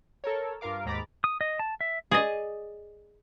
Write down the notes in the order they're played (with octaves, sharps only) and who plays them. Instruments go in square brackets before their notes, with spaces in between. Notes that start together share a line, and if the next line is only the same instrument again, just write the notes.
[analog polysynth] A4 A#4 C#5
G2 F4 A#4 F5 D6
D#2 G#2 A#5 B5 D6 A6
[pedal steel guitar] D#6
D#5
A5
E5
[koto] G#4 D5 D#5